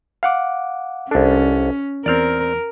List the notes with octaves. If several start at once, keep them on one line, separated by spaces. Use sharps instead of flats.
F5 F#5 D6
C2 C#4 D4 A4
E2 C4 A#4 D5 F6